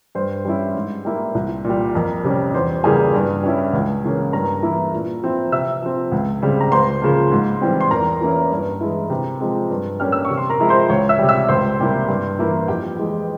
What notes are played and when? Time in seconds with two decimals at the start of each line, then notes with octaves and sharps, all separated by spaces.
0.15 G2 C5
0.45 G3 C#4 E4
0.75 G#2
1.05 G3 A#3 E4
1.35 C2
1.65 A#2 G3
1.95 F2 A#4
2.24 C3 G3 C#4
2.54 E2 C5
2.84 C#3 E3 G3 A#3 G#4 G#5
3.14 G2
3.43 G3 C#4 E4
3.73 C#2
4.03 C#3 E3 A#3 C#4
4.33 G2 A#4 A#5
4.63 E3 A#3 E4
4.92 A#2
5.22 F3 C4 E4
5.52 C3 E5 E6
5.82 F3 C4
6.12 C#2
6.42 C#3 G3 C4
6.61 A#5
6.72 C#2 C5 C6
7.02 C#3 F3 A#3
7.32 G#2
7.61 E3 G3 C4
7.81 C6
7.91 E2 A#4 A#5
8.21 E3 A#3 C#4 E4
8.51 G2
8.80 E3 G#3 E4
9.10 C3
9.40 F3 G#3 C4
9.70 G2
10.00 G3 A#3 C#4 F6
10.12 E6
10.25 C#6
10.30 C3
10.37 C6
10.49 A#4 A#5
10.60 F3 G#3 E4
10.69 C5 C6
10.90 C#2 C#5 C#6
11.09 E5 E6
11.19 C3 G3
11.29 E5 E6
11.49 C#2 C5 C6
11.80 C3 G3 A#3 E4
12.08 G2
12.39 E3 A#3 E4
12.68 F2 G4 G5
12.99 E3 G#3